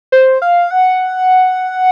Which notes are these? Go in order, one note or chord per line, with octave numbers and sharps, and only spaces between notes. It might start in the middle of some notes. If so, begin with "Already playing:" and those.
C5
F5
F#5